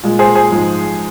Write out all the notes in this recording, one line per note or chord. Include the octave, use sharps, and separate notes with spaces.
A#2 G#3
G#4 C5
G#4 C5
G#2 F3 G#3